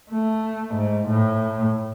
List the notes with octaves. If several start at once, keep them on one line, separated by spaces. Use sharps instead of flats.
A3
G#2
A2